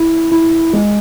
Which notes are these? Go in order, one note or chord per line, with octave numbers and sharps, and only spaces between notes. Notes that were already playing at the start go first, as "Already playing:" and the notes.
Already playing: E4
E4
G#3